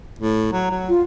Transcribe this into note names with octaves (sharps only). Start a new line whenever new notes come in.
A2
F#3 A#5
F#3
F4